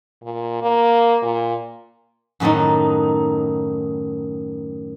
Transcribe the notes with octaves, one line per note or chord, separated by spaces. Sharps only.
A#2
A#3
A#2
F#2 A2 D#3 F#3 D#4